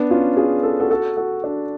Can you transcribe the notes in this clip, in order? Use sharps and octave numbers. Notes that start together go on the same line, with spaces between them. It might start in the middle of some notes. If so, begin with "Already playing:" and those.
Already playing: B3 D4
C#4 F4
F4 G#4
A4
F#4 A4
F#4 A4
F#4 A4
D4 F#4